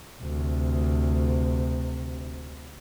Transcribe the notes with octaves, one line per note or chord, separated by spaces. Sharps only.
D2 C3